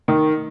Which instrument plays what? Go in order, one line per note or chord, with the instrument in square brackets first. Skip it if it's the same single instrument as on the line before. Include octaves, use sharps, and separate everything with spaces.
[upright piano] D#3